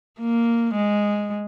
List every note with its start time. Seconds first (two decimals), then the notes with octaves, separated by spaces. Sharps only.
0.20 A#3
0.74 G#3